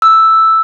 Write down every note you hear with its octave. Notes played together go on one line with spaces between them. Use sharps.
E6